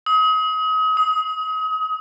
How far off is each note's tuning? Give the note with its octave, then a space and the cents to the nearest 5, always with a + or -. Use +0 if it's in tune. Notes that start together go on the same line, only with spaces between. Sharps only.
D#6 +35
D#6 +20